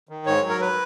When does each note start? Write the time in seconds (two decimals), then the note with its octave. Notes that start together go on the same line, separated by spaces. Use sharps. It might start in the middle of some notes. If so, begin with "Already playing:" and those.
0.09 D#3
0.26 G#2 C#5
0.43 F#3
0.50 A#4
0.61 B4